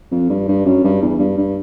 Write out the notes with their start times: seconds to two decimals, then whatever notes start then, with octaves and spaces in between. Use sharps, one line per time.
0.11 F2
0.29 G2
0.48 G2
0.65 F#2
0.84 G2
1.02 E2
1.19 G2
1.38 G2